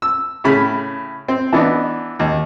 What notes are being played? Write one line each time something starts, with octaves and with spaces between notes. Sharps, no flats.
E6
A2 C#3 B5
C4
E3 B3 D4 D#4
D#2